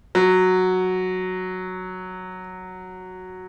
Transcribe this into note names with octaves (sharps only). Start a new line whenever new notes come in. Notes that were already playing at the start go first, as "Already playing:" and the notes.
F#3